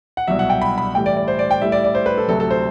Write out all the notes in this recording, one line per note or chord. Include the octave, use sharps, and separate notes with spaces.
F#5
C2 B2 F#3 E5
F#5
G5
B5
B5
A2 E3 G3 G5
D5
D5
C5
D5
G5
A2 G3 E5
D5
D5
C5
B4
A4
D2 C3 F#3 A4
A4
C5